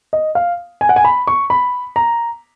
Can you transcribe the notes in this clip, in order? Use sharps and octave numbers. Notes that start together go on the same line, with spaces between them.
D#5
F5
G#5
F#5
G#5
B5
C#6
B5
A#5